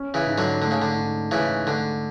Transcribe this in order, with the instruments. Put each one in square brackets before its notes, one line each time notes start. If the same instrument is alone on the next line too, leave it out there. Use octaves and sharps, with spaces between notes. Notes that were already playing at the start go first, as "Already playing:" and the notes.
Already playing: [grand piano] C#4
[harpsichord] C#3 E3
[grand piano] G#2
[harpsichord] D3 F#3
[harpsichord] D3 [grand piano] A3
[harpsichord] C#3
D3
[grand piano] G#2
[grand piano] G#2 [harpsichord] C#3 E3
[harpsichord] D3 [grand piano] A3